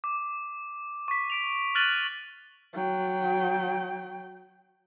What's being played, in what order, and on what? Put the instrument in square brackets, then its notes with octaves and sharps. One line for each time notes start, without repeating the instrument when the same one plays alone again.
[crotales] D6
C#6 B6
B6 D7 F7
F6 F#6 A6 D#7 F#7
[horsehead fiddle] F#3 G5